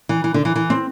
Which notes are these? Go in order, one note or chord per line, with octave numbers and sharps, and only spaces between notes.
E3
E3
D3
E3
E3
C4